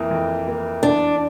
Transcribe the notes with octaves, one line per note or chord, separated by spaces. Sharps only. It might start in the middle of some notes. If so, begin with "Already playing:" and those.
Already playing: F2 E3 A#3 E4 A#4
F2
E3 A#3 E4 A#4
E2 D4